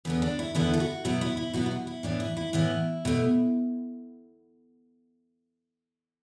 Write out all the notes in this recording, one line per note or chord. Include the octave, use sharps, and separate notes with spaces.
E2 D3 B3 B4
D4
E4
E2 D3 B3 E4
A4
F#4
B2 F#3 B3 E4
E4
E4
B2 F#3 B3 F#4
E4
F#4
E4
A2 E3 B3 D4
E4
E4
A2 E3 B3 E4
B2 A3